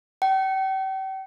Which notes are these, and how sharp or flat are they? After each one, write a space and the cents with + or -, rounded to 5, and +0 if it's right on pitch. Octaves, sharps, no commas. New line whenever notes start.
G5 -40